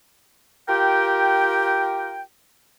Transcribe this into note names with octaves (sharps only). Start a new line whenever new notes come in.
F4 G4 A#4 G5